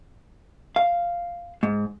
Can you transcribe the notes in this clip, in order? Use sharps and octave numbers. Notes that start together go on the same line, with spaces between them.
F5
G#2